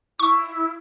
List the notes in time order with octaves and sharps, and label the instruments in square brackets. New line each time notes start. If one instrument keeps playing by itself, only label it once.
[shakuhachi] E4 [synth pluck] C#6